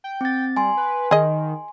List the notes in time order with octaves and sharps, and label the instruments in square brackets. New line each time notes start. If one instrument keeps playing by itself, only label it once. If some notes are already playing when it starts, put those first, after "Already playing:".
[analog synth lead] G5
[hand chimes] C4 A6
[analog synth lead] G3 [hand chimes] G#5 C6
[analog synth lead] B4
[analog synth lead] D#3 [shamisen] G#4 D#5